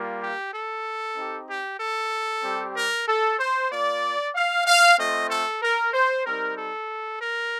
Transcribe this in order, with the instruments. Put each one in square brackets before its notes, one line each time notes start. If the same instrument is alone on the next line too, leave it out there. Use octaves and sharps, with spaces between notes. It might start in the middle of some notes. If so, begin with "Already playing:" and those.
Already playing: [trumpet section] G3 A#3 F4
G4
A4
C4 D#4 G4
G4
A4
G3 C4 G4
A#4
A4
C5
A#3 F4 D5
F5
F5
A3 C4 F4 D#5
A4
A#4
C5
G3 C4 D#4 A#4
A4
A#4